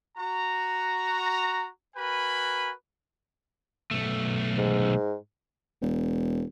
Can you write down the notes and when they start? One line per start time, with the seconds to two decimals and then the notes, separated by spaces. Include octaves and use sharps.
0.18 F#4 A#5
1.96 F#4 A#4 B4 G#5 B5
3.91 B1 A3
4.58 G#2
5.82 E1